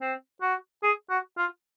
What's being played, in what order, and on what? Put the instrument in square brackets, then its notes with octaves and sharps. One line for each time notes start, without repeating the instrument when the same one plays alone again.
[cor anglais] C4
F#4
G#4
F#4
F4